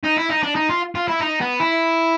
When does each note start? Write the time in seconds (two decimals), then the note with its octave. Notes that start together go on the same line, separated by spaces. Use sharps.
0.04 D#4
0.17 E4
0.30 D#4
0.43 D4
0.55 D#4
0.69 F4
0.95 F4
1.08 E4
1.21 D#4
1.41 B3
1.60 E4